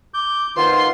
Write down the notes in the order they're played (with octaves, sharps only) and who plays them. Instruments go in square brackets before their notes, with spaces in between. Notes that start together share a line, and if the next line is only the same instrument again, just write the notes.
[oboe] D6 [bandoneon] G6
[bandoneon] D#3 F4 [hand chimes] B4 F5 F#5 [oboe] C5 [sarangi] C6